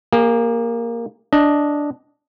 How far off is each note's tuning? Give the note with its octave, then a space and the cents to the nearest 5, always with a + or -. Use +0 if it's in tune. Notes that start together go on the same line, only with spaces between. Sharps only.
A#3 +0 G#4 -45
D4 -5 D#5 +0